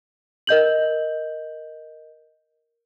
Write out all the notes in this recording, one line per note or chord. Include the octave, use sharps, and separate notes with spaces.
A#4 D#5 G6 F#7